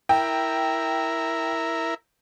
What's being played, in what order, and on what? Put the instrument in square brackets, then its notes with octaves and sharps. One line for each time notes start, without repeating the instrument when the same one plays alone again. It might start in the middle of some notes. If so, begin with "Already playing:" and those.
[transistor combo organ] E4 A#4 [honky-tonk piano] G5